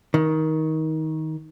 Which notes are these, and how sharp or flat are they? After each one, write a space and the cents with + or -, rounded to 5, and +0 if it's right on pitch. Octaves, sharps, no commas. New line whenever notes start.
D#3 +20